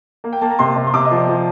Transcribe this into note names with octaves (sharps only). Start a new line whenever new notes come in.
A#3
G5
A#3 A5
A#5
C3 C6
C3
C6
C3 D6
D#5
F3
D5
F3